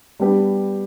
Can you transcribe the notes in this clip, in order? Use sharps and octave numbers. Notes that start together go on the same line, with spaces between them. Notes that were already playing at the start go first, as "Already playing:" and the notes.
G3 B3 D4 G4